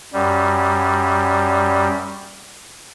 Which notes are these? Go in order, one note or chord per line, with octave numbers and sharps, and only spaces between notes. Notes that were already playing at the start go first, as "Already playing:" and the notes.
F#2 G3